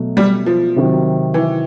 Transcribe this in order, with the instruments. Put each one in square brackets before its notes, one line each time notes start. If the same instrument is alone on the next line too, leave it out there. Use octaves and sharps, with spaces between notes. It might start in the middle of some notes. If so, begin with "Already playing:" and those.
Already playing: [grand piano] B2 F#3 A3
[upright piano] G3
F3
[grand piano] C3 D#3 F#3
[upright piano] E3